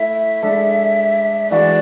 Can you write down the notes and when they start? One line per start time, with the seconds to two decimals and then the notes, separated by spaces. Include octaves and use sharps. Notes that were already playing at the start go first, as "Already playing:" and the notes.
Already playing: A3 E4 E5
0.43 G#3 D4 A4
1.50 E3 G#3 D4 F#4 D5